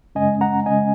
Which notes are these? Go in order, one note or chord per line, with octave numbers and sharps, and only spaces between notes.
F#2 C#3 G#3 C#4 D#5 G#5
F#5 A#5
C#3 G#3 C#4 D#5 G#5